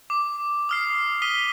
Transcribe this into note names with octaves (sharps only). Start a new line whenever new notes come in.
D6
D#6 F6 C7
D#6 B6 D#7 G7